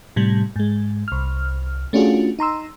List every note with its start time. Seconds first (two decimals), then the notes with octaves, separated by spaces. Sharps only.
0.16 A2 C3 G3
0.56 G#2 G#3
1.08 C2 F6
1.93 A3 C#4 D4 F4 F#4 G#4
2.39 D#4 A#5 C6 E6